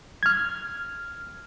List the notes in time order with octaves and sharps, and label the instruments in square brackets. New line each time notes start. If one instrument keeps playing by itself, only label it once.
[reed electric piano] F6 G#6